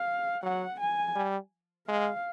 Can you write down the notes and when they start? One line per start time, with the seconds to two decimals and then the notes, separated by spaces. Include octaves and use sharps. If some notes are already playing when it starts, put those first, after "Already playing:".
Already playing: F5
0.43 F#3 F#5
0.80 G#5
1.15 G3
1.88 G#3 F5